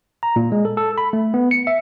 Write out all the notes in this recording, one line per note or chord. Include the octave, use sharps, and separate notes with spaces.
A#5
A#2
G#3
A4
A4
B5
A3
B3
C#7
E5